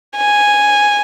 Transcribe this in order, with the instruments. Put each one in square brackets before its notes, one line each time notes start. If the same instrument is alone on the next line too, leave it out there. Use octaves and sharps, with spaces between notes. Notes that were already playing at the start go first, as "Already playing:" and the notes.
[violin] G#5